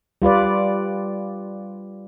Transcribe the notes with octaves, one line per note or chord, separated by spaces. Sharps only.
G3 F4 B4 D5